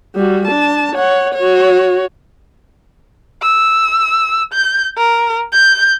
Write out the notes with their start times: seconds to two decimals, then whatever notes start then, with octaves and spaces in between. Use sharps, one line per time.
0.15 G3 F#4
0.47 D4 A5
0.95 C#5 F#5
1.34 F#4 C#5
3.42 E6
4.53 G6
4.97 A#4
5.53 G6